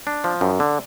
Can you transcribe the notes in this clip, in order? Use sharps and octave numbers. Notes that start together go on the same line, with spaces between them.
D4
F3
F#2
D3